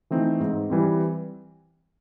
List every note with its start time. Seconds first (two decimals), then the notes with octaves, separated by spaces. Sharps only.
0.10 E3 A3 C4 D#4
0.40 G#2
0.70 E3 G3 C4